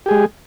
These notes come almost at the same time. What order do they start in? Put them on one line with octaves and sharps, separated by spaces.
G4 G#4 G#3